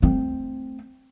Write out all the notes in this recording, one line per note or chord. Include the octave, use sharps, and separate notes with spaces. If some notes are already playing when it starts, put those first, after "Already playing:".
A3 C4